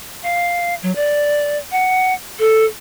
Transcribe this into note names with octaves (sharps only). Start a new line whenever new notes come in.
F5
F#3
D5
F#5
A4